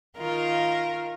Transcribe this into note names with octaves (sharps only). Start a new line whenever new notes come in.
D#3 F4 A#4